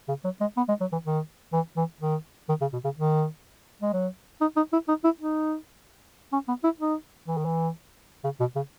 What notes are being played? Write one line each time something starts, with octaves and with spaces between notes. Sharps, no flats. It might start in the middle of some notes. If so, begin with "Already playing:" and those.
C#3
F#3
G#3
B3
G#3
F#3
E3
D#3
E3
E3
D#3
D#3
C#3
B2
C#3
D#3
G#3
F#3
D#4
D#4
E4
D#4
E4
D#4
C#4
B3
E4
D#4
E3
D#3
E3
C#3
B2
C#3